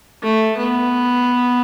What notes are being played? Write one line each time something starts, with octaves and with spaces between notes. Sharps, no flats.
A3
B3